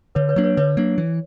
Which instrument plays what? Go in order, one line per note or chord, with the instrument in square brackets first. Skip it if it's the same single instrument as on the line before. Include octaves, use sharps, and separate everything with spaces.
[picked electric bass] D3 [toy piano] B4 C#5
[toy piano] B4 C#5
[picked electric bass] F#3 A#3 D4
[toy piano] B4 C#5
[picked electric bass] D3 [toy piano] B4 C#5
[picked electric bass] F#3 A#3 D4
E3